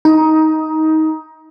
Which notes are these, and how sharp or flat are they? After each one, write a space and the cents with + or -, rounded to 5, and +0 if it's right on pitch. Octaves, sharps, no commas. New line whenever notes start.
D#4 +15